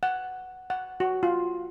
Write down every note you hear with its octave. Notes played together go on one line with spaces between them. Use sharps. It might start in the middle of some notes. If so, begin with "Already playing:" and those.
F#5
F#5
F#4
F4